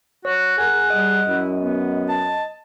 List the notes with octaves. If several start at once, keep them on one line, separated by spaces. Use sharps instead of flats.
F#4 C#5
G#4 A#4 F#5 G#5
G3 D#5
F#2 E4
B3
A5